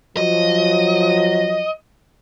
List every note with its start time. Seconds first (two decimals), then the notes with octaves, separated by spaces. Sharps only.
0.17 F3 F#3 D#5